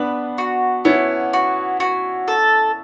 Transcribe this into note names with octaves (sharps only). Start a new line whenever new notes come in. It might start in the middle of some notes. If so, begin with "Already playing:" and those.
Already playing: B3 D4 B4
F#4
B3 C#4 E4
F#4
F#4
A4